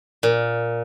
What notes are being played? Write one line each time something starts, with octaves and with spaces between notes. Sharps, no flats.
A#2